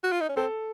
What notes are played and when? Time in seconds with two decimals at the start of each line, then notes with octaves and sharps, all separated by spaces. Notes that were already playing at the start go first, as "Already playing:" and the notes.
0.04 F#4
0.12 F4
0.21 D#4
0.29 C#4
0.37 C4 A4